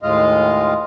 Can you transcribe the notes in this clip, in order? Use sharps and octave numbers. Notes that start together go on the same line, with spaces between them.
D#2 A2 G#3 F4 D#5 F5